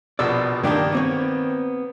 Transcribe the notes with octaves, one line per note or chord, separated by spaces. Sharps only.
A#1 B2 D5 E6
G2 D#3 A#3 D4 G4
B3 C4 C#5